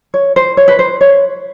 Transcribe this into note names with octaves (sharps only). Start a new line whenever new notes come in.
C#5
C5
C#5
B4
C5
C#5